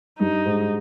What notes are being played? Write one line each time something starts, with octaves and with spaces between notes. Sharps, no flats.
G2 D#4
G#2